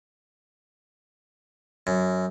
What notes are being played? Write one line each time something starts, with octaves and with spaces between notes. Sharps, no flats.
F#2